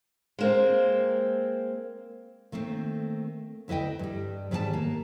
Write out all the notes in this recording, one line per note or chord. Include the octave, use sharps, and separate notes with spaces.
G#3 A#3 C4
D#3 A3 A#3 C4
D2 E4 B4 D#5 G5
G2 G3
G#2 D#3 G3 A#4 B4 A5
A#3